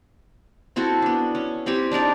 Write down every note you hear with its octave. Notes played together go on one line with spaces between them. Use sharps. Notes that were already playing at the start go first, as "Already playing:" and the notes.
C4 E4 F#4 A4
B3 D4
C#4
G3 C4 E4 G4
D4 D#4 A#4 D5